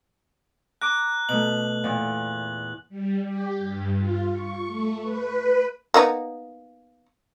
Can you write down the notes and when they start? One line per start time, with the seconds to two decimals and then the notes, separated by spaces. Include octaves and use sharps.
0.81 A#5 D6 F#6
1.29 B2 A3 F#7
1.84 E2 A#2
2.89 G3
3.22 G4
3.59 G2
3.96 F4
4.32 C#6
4.66 A3
5.01 B4
5.94 A#3 B3 D#4